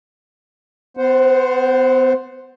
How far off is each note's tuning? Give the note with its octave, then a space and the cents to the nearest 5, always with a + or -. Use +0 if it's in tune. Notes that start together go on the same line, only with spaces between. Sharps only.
B3 +40 C5 +0 F#5 +0